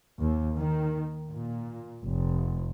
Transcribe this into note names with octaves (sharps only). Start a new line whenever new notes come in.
D#2
D#3
A#2
F1